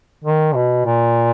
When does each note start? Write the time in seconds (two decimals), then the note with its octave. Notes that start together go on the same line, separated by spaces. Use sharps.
0.24 D#3
0.55 B2
0.86 A#2